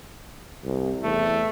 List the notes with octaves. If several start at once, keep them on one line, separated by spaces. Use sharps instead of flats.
C2
E2 A3